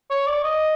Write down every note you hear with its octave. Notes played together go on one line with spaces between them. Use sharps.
C#5
D5
D#5